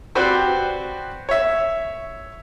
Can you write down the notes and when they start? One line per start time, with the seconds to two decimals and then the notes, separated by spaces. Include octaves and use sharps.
0.15 C4 F#4 G4 B4 C5 D5
1.29 C#5 E5